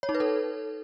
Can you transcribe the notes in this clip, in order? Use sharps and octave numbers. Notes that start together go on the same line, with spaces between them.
C#5
D#4
B4
A4